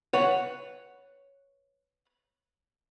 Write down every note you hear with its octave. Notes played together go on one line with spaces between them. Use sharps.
B4 C#5 F#5